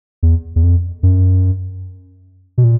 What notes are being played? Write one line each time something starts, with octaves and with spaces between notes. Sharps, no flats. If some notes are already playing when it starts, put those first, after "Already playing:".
E2
E2
F2
F#2
B2
A#2